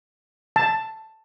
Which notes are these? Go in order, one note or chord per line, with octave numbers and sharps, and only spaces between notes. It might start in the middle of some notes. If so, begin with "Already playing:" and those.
A5